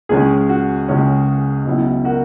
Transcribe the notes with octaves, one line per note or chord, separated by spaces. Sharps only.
C#2 C#3 G#3 C#4 G#4
F#4
C#2 C#3 G#3 C#4
C#2 B2 F#3 C#4 E4
F#4 A#4